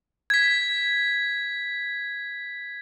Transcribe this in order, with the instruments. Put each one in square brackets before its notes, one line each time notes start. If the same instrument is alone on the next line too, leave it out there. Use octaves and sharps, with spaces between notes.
[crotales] G#6 B6